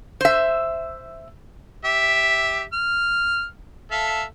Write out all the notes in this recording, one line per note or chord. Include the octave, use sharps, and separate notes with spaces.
C5 E5
G4 E5
F6
A4 E5 F5